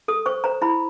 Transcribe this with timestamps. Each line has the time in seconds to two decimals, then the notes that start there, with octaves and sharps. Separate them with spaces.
0.08 A4 D#6
0.26 C5 C#6
0.44 C5 A#5
0.62 E4 B5